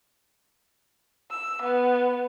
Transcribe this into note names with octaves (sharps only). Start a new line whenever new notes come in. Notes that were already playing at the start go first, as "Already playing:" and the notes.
E6
B3